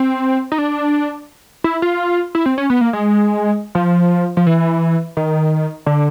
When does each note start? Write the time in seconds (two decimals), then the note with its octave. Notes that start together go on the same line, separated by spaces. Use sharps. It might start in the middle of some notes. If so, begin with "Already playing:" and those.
Already playing: C4
0.52 D#4
0.58 D4
1.64 E4
1.82 F4
2.35 E4
2.46 C4
2.58 C#4
2.70 B3
2.81 A#3
2.93 G#3
3.75 F3
4.37 F3
4.47 E3
5.17 D#3
5.86 D3